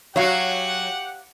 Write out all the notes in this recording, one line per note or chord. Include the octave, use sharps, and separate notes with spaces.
F#3 F#4 G4 C#5 F5 F#5